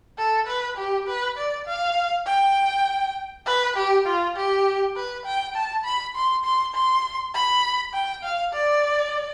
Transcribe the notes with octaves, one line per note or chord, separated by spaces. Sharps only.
A4
B4
G4
B4
D5
F5
G5
B4
G4
F4
G4
B4
G5
A5
B5
C6
C6
C6
B5
G5
F5
D5